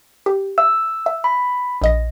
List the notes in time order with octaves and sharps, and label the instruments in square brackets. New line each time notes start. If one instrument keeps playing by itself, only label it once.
[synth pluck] G4
[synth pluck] E5 [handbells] E6
[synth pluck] E5
[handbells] B5
[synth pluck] A#1 D#5 A#6